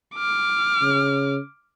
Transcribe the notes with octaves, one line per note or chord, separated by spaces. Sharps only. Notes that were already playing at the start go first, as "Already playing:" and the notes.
D6 F6
C#3